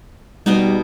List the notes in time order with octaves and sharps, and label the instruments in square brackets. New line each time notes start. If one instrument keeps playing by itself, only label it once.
[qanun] B2 B3 D#4 [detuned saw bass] G3